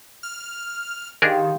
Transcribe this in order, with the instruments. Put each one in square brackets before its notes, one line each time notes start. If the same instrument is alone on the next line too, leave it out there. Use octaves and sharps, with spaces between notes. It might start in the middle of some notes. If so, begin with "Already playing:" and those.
[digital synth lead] F6
[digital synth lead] D#3 [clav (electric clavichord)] D4 G#4 A#4 [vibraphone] G4 F5 C6